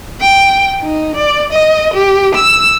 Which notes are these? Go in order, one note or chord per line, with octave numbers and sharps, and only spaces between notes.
G5
D#4
D5
D#5
G4
E6